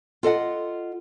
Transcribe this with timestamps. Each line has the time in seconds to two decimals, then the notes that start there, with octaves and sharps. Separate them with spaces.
0.23 F4 A4 D#5 F#5